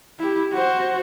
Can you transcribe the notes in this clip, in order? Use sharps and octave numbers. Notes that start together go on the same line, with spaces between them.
E4 G4
F#4 C5